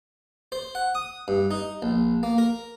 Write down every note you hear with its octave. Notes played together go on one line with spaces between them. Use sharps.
C5
F#5
D#6
G2
D#4
A#1
A#3
A#4